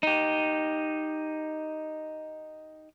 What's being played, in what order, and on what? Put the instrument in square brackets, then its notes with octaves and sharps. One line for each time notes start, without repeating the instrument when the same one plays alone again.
[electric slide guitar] D#4 G4